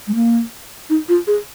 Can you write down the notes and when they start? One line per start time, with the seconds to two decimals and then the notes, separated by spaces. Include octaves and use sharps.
0.07 G#3
0.15 A#3
0.90 D#4
1.09 F4
1.27 G#4